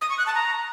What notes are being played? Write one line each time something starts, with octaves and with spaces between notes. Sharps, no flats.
D#6
C#6
F#6
A5
A#5